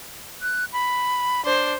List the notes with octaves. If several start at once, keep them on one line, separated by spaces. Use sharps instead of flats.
F#6
B5
D4 C5